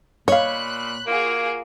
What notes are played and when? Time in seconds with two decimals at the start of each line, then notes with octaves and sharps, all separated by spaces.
0.28 A#2 C#5 D#5 F5 B5 F#6
1.06 A#3 F4 F#4 G#4